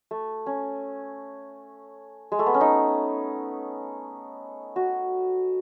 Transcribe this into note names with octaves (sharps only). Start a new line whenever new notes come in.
A3
C#4
G#3
A3
B3
C#4
D#4
F#4